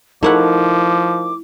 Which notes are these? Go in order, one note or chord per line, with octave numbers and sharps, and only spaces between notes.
F3 A3 D#4 E4 A#4 F#5 D6